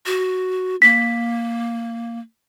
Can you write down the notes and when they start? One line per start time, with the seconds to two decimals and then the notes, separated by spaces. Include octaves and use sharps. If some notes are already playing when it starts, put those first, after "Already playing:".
0.06 F#4
0.82 A#3 B6